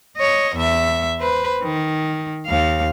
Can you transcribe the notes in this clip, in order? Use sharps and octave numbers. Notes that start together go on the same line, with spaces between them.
C#5 D#5
E2 E5
B4 C5
D#3
D#2 F5